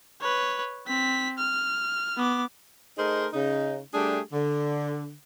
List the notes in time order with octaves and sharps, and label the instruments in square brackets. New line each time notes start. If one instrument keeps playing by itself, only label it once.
[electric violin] B4 C#5
C4 B6
F6
B3 D6
[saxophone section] A3 D#4 G#4 A#4 C5
C#3 D#4
G3 A3 D4 G4 G#4
D3